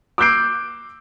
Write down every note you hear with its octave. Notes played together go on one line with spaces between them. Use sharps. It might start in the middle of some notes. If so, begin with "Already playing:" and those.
D6 E6 F#6 G6 C7 D7